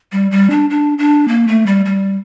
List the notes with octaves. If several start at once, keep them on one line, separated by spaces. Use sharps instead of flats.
G3
G3
D4
D4
D4
A#3
A3
G3
G3